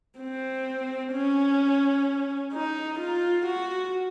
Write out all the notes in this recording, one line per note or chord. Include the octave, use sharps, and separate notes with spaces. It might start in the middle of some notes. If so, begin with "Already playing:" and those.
C4
C#4
D#4
F4
F#4